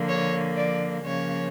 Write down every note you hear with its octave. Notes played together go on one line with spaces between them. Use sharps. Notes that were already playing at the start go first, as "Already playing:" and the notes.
Already playing: D3 F3 A#3
C#5
D5
C#3 F3 A#3 C#5